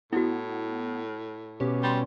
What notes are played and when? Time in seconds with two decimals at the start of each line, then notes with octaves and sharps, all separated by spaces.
0.13 A2 B3 E4 F#4
1.60 B2 C#4 G4
1.83 G3 C6